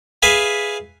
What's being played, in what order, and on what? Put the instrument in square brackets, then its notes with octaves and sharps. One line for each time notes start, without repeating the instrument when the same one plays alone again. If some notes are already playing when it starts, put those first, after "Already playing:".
[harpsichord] G#4 B4 E5 F5 G#5